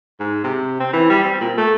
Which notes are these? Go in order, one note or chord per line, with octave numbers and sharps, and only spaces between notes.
G#2
C3
C4
E3
G3
C4
A#2
A3